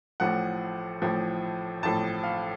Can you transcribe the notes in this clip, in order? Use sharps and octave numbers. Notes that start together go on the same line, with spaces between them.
A1 A2 F3 F#5
A1 A2 F3
A1 A2 F3 A5
F5